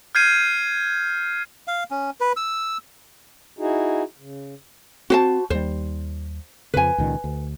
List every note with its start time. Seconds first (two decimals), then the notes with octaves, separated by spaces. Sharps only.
0.15 F6 G6 G#6 C7 D#7
1.67 F5
1.91 C#4
2.20 B4
2.37 E6
3.59 D#4 E4 F#4 G#4
4.19 C#3
5.10 C4 F#4 C5 A5
5.50 D#2 G3 C5
6.74 F2 C#3 B4 G#5
6.98 C#2 A#2 D#3
7.24 D2